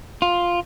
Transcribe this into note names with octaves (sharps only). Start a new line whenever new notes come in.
F4